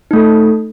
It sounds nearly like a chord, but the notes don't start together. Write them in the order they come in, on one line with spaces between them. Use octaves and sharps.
D#4 A3 A4